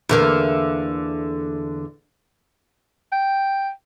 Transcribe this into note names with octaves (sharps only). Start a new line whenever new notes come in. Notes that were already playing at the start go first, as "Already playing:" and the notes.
E2 D3 A#3
G5